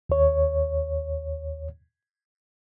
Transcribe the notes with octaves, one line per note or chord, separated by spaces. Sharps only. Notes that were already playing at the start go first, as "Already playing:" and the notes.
D#2 C#5